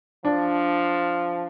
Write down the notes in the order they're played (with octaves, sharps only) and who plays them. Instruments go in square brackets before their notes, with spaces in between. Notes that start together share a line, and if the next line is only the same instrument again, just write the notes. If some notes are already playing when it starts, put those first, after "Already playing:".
[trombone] F3 [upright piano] D4